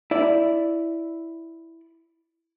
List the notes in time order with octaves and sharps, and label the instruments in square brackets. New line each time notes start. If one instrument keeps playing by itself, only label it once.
[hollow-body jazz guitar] E4 D5